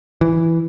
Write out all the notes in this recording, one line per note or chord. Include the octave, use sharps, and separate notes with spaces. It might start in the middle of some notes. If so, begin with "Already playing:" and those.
E3